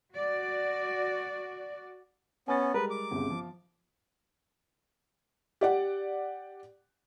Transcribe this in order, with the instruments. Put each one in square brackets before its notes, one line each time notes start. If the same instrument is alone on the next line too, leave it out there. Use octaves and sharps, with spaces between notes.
[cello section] F#4 D5
[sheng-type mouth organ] B3 C#4 [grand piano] G#5 A6
[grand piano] G3 G#3 A#4 [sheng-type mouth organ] B4
[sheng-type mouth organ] D6
[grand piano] G1 C2 C#3
F3
[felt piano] G4 D5 F#5